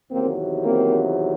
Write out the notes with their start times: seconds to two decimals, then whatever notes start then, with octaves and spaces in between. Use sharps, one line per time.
0.11 E2 C3 D#3 F#3 A#3 C4
0.65 A#3 C4